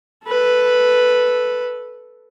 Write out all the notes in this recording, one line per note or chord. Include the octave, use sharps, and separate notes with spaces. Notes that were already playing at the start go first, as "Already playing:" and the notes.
A4 B4